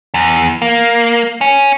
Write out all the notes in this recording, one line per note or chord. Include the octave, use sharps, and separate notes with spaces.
E2
A#3
C#4